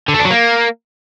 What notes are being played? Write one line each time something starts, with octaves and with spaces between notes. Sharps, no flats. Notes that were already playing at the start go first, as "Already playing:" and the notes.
D3
A3
D4
F#3
A#3